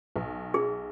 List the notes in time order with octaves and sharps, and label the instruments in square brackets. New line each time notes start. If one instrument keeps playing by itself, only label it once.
[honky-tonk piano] B1
[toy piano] G#4